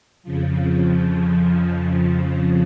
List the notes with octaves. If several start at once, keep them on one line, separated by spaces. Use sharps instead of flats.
F2 C#3 F3